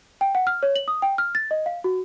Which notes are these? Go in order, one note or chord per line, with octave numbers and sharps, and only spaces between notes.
G5
F#5
F6
C#5
F#7
D#6
G5
F6
A6
D#5
F5
F#4